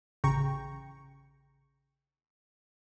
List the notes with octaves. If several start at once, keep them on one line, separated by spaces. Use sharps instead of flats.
A1 C#3 G5 A#5 C#6